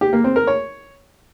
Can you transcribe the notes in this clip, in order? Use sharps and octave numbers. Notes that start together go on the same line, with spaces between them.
G4
A#3
C4
A#4
C#5